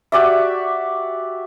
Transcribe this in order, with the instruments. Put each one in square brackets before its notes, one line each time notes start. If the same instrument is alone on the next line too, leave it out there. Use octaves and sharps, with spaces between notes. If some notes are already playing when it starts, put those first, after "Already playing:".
[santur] F#4 G4 D5 E5